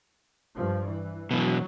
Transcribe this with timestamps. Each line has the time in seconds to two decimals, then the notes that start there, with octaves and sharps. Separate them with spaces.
0.55 G2 F3
0.87 E3
1.31 B2 E3 F#3